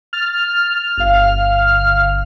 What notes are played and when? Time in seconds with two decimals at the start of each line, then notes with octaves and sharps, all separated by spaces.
0.13 F6 A6
0.97 G1 F5